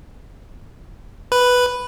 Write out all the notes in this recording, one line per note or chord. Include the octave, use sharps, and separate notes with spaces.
B4